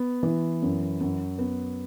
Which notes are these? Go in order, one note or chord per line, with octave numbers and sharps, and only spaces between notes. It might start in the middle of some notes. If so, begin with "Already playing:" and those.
Already playing: B3
E3
F#2
F#2
B3